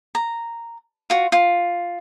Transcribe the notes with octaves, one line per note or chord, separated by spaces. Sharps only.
A#5
F4 F#4
F4